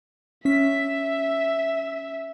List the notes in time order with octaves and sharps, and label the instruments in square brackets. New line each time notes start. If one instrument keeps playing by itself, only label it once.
[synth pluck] C#4 B6 [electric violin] E5